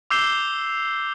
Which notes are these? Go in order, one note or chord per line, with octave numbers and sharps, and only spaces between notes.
D6 E6 G6 C7 E7 G7